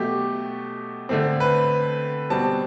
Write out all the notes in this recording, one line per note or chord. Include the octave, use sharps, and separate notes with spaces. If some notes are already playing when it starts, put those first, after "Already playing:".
Already playing: B2 F#3 A3 G4
D3 A3 C4
B4
B2 G3 C4 A5